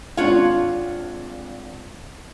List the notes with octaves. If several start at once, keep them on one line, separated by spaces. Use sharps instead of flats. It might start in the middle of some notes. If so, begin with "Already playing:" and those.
G#1 D4 F4 C#5 F5 F#5